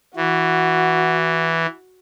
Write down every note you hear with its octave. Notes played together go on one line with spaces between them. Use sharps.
E3 F#4